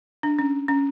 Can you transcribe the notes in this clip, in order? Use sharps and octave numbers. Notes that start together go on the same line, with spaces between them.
D4
C#4
C#4